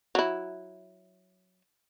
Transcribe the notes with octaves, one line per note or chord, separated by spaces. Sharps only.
F#3 E4